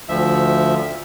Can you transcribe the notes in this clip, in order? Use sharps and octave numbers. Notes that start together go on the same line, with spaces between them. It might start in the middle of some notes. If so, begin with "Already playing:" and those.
D2 F3 E5